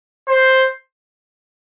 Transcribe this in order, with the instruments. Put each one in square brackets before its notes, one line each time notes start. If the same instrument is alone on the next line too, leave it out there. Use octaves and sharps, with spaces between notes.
[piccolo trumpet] C5